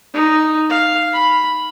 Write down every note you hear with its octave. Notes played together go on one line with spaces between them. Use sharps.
D#4
F5
B5